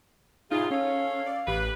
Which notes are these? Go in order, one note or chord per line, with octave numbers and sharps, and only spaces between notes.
A2 C3 D#4 F4 G#4
C#4 A4 C#5 F5
D5
A1 G4 B4 B5